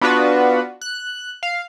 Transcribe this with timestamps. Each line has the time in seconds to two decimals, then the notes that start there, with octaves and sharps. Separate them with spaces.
0.01 B3 D4 F4 F#4 B4
0.81 F#6
1.43 F5